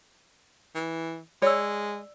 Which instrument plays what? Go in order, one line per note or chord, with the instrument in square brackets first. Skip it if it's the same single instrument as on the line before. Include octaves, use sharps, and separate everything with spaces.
[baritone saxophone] E3
[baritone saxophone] G#3 [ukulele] C#5 [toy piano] D5 E6